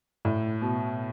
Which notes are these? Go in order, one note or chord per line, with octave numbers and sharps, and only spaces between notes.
A2
B2